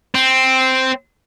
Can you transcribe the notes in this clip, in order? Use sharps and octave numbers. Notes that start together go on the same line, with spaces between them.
C4